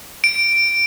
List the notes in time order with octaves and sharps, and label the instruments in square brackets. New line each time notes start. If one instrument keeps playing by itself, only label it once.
[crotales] D7